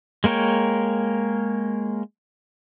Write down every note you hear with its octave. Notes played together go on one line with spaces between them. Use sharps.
G#3 A#3 A#4 C#5 G5